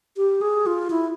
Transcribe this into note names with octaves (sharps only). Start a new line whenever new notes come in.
G4
G#4
F4
E4